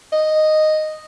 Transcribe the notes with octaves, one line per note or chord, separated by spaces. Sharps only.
D#5